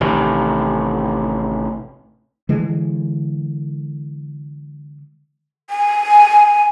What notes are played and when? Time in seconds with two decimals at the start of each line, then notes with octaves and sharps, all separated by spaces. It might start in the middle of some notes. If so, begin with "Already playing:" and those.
0.01 A1 C3 D#3
2.49 D3 E3 G#3
5.70 G#5